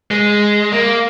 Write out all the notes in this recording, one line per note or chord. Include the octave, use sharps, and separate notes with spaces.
G#3
A#3